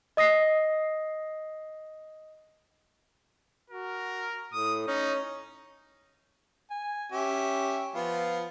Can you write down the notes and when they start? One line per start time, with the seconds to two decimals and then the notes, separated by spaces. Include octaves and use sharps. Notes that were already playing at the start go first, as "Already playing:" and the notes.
0.17 D#5 D#6 A#6 C7
3.70 F#4 A#4
4.53 A2 D#6
4.88 C#4 D#4
6.71 G#5
7.12 C#4 G4 E5
7.95 F3 B3 F4